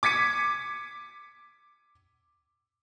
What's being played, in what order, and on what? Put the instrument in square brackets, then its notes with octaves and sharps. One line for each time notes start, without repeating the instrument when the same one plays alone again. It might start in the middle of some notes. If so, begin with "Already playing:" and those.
[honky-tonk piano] D6 G#6 B6 C#7 D#7